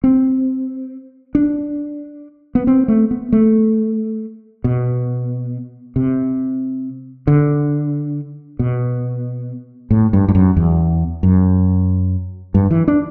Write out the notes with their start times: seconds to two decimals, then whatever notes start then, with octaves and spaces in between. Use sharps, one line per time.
0.04 C4
1.35 D4
2.55 B3
2.67 C4
2.88 A3
3.11 B3
3.32 A3
4.64 B2
5.96 C3
7.27 D3
8.59 B2
9.91 A2
10.13 G2
10.29 G2
10.35 F#2
10.57 E2
11.23 F#2
12.54 G2
12.71 E3
12.88 D4